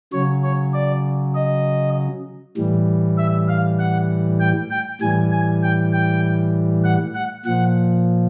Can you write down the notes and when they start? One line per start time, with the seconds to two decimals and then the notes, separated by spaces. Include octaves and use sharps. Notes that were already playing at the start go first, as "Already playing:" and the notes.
0.13 C#3 F#3 C#5
0.43 C#5
0.74 D5
1.35 D#5
2.57 A2 E3 G3
3.18 E5
3.48 F5
3.79 F#5
4.40 G5
4.71 G5
5.01 A2 E3 G3 G#5
5.32 G#5
5.63 G5
5.93 G5
6.84 F#5
7.15 F#5
7.46 A#2 F3 F#5